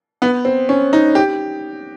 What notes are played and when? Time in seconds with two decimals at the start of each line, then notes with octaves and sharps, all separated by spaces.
0.22 B3
0.45 C4
0.69 C#4
0.93 D#4
1.15 G4